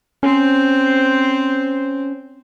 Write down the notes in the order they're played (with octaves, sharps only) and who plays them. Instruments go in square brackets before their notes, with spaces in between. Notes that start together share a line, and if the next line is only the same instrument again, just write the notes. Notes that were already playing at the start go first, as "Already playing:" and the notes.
[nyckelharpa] C4 C5 [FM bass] C#4